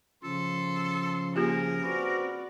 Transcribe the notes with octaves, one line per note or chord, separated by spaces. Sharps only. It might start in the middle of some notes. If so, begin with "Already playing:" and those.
C#3 F3 A4 C6
A#3 F4 G4 G#4 A#4
C4 F#4 B4 D5